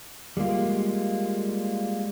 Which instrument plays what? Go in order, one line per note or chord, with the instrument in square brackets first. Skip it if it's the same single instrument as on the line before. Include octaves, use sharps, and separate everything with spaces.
[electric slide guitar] G3 G#3 A#3 F4